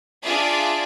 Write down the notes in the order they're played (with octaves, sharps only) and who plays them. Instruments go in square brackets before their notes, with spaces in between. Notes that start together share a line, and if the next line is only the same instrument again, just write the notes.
[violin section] D4 F4 G#4 D5 E5